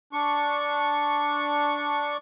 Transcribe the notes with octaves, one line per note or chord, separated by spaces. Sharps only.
D4 C#6